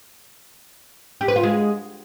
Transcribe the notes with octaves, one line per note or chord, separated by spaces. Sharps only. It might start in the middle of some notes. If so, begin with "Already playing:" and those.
G4
B4
F4
G#3